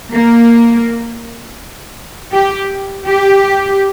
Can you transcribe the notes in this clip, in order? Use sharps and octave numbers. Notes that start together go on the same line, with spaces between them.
A#3
G4
G4